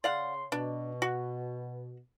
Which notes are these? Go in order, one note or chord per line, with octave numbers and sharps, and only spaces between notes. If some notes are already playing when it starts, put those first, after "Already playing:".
C#3 D5 F5 F#5 C6
B2 D4
F#4